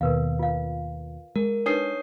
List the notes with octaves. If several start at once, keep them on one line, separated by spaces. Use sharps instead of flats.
D#2 B2 A#4 B4 F5
F4 F5
G#3 A#4
D4 D#4 B4 C#5 D#6 C7